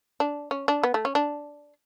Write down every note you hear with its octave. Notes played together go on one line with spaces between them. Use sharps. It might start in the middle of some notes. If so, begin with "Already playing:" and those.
D4
C#4
D4
B3
A3
C#4
D4